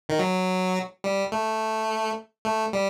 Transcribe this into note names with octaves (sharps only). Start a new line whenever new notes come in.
D#3
F#3
G3
A3
A3
G3